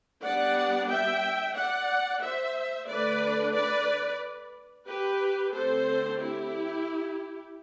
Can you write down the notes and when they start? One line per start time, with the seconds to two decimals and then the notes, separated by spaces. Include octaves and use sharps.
0.23 G3 B3 D4 D5 F#5
0.90 E5 G5
1.56 D5 F#5
2.22 C5 E5
2.88 D3 A3 D4 B4 D5
3.54 B4 D5
4.87 G4 B4
5.53 D3 A3 C4 A4 C5
6.19 E4 G4